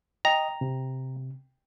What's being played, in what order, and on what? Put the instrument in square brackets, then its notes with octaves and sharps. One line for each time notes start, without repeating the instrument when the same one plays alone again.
[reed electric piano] D#5 [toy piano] G5 [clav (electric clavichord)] A#5
[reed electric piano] C3